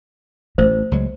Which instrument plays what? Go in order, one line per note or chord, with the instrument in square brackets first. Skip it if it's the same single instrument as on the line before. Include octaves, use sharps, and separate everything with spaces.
[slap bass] A1 [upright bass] A3 [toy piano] C5
[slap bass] C#2 F#3 G#3